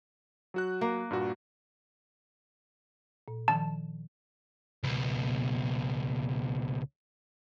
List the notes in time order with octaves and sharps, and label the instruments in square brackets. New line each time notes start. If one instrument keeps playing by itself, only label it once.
[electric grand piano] F#3 F#4 F#6
[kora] A#3
[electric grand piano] G2 A#2 F#4
[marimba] A#2
[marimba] D#3 F3 [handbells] A5
[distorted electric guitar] C#2 B2